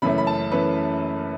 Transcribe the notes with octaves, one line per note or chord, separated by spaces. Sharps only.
F#1 F#2 E3 A3 C#4 B5
B5
A5
E3 A3 C#4 B4